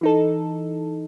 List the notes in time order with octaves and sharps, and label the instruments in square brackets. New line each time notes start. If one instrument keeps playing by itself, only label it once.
[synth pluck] E3 D#4 A4